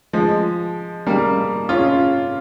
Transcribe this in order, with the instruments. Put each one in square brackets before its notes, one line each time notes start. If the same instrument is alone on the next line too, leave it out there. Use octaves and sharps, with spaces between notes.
[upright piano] F3 G#3
G3 A#3
C#4 F4